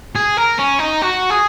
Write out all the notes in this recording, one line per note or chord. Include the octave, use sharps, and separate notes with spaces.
G#4
A#4
C#4
D#4
F#4
G#4